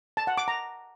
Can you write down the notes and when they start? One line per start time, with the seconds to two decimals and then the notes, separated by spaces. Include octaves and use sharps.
0.17 A5
0.27 F#5
0.38 D6
0.48 A#5